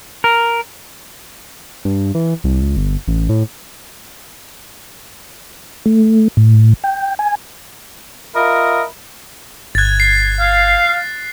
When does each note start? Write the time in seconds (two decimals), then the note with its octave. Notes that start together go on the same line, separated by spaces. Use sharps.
0.24 A#4
1.85 G2
2.15 E3
2.44 C2
2.62 C#2
2.77 G1
3.08 A1
3.29 A2
5.86 A3
6.37 A2
6.84 G5
7.19 G#5
8.35 F4 A#4 D#5 E5 B5
9.75 G1 F#6 G#6 A6
10.00 C7
10.40 F5